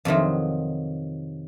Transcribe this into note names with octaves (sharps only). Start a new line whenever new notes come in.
F2 C3 D#3 F#3